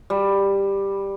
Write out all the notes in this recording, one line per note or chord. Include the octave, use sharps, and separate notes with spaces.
G3